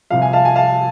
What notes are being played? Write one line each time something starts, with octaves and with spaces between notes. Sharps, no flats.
C2 C3 F3 F5
G#5
F5 A5
G#5
F5 A5